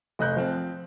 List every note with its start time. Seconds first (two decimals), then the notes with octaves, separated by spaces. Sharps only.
0.19 F1 D#5 F#6 G6
0.36 F3 C4